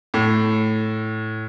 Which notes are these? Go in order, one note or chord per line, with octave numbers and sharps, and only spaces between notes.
A2